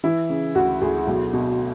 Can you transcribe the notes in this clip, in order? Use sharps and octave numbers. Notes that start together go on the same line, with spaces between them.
E3 E4
C#3
D2 F#4
D2 G#4
B1
B2